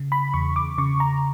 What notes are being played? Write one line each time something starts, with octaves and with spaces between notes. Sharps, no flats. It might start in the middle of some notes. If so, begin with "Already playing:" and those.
Already playing: C#3
B5
E2 C#6
D6
C#3 C#6
A#5